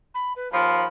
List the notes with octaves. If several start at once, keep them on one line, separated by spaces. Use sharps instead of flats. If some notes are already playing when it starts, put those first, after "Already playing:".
B5
B4
D#2 F3 B5